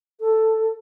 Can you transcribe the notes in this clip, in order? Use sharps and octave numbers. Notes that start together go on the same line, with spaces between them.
A4